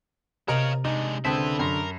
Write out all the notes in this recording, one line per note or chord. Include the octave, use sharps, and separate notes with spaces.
C3 A#4 C#5 D#5 F5 A#5
G#3 D4 D#4
C#2 D3 C4 E4 B4 A5 D#6 B6
F#2 A#4 B5 C6